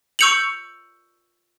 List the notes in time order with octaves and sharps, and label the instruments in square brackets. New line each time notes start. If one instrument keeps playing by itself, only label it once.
[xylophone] C#6 E6 G6 C#7 F7 F#7